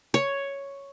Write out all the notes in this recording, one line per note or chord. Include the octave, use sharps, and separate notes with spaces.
C#5